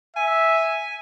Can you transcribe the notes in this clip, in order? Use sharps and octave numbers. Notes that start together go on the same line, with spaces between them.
E5 G#5